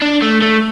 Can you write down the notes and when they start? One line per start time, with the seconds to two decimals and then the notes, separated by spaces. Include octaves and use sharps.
0.02 D4
0.22 A3
0.42 A3